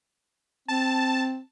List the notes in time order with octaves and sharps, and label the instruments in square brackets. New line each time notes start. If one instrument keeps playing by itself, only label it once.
[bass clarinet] C4 [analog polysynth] A5